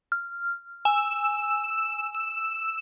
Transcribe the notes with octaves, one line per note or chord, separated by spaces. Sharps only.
F6
G#5 E6
E6